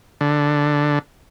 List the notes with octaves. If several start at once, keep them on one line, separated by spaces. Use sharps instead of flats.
D3